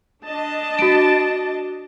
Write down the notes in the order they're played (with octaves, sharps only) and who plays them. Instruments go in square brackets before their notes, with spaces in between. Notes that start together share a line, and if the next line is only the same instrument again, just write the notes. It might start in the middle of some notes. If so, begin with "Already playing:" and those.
[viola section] D4 D#5 A5
[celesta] F#4 D7